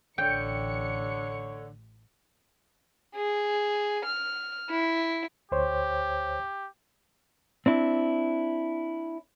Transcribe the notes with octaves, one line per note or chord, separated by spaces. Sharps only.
A1 D3 C#5 G5 C#7
G#4
F6
E4
D2 G4 C5 C#5
C4 D4 E4